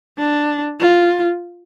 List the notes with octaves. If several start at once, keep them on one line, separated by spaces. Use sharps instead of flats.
D4
F4